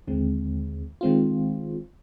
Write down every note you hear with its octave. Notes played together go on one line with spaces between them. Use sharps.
D#2 D3 G#3 C4
D#3 G#3 C4 F4